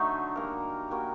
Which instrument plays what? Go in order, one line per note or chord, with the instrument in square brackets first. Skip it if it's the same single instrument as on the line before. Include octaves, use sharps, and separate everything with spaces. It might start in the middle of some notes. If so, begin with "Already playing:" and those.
Already playing: [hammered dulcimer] D3 F#3 A3 D#4
G3 A#3 F#4 A#4
G3 A#3 F#4 A#4